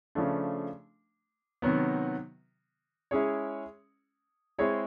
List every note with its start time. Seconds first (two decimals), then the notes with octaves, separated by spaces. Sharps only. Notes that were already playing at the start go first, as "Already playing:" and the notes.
0.15 C#3 F3 A3 D4
1.62 C3 D#3 F#3 B3
3.11 G#3 C#4 E4 G#4 C#5
4.58 G#3 C4 E4 G#4 C#5